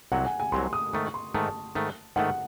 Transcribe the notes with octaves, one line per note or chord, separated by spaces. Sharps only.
C2 C3 F#3 F#5
G#5
G#5
C2 C3 F#3 C6
D#6
G#2 D#3 A3 C#6
C6
G#2 D#3 A3 A5
G#2 D#3 A3
G#2 D#3 A3 F#5